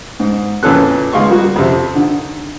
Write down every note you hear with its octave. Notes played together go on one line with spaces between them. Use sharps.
G#2
F2 A#2 E3 C#4 A4 F#6
D#2 B2 G#3 F5 C6 C#6
G3 A#3 F#4
F2 C3
D3 D#3